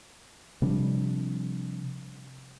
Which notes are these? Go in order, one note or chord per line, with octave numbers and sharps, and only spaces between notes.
C3 F3 G3 D4